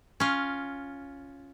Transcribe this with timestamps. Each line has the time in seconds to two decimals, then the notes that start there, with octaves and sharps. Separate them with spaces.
0.20 C#4 F4